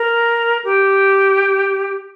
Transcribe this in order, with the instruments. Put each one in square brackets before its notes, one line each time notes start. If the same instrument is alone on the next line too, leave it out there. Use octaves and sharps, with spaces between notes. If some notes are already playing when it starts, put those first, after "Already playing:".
Already playing: [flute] A#4
G4